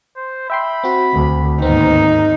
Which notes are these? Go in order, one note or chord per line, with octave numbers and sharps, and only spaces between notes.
C5
E5 G5 B5 C6
C4 F#4
D2
D#2 G#2 B3 C4 D#4 A#4